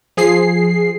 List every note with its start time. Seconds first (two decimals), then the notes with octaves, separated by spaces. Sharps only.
0.17 F3 G#4 C7